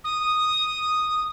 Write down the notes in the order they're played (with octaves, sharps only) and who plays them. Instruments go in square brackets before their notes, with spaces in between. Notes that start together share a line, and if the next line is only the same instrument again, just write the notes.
[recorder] D#6